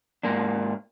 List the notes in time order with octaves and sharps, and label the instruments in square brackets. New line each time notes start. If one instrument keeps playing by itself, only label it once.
[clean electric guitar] G#2 A#3 D4